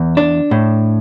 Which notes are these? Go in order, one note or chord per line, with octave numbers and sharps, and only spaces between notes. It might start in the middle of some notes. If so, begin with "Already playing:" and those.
Already playing: E2
D4
A2